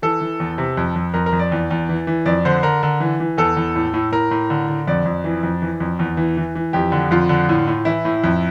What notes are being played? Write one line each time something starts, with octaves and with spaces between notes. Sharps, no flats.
E3 A4
E3
E2
C3
F2
F2
F2 A#4
A#4
F2
D5
E2
E2
E3
E3
F2 D5
D3 C5
D3 A#4
D3
E3
E3
E2 A4
E2
A2
A2
A2 A#4
A2
D3
D3
F2 D5
F2
E3
F2
E3
F2
E2
E3
E3
E3
F2 G4
D3
F2 F4
D3
A2
A2
E3 E4
A2
F2